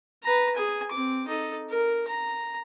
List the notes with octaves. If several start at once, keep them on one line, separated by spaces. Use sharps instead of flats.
B4 A#5
G#4 G#5
C4 D6
D#4 A4
A#4
A#5